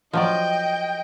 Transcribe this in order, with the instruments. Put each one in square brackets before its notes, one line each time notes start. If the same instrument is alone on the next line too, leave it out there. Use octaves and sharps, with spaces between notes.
[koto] F3 F#3 D5 [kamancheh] D#5 G5